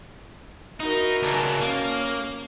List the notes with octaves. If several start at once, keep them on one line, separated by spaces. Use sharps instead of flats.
D#4 E4 F#4 A#4
C#2 D4
A#3 C#4